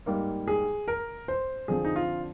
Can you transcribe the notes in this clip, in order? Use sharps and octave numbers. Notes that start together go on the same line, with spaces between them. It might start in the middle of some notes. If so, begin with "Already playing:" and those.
G#2 G3 A#3
G#4
A#4
C5
D3 F3 C4 G#4
D#4
F4